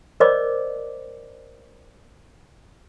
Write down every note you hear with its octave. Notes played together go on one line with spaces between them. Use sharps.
A#4 C5 D5 D#5 D6